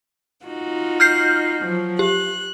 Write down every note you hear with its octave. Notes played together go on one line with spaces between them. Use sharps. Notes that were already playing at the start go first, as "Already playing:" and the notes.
D#4 F4 F#4
F6 G6 C7
F3 F#3
G4 F#6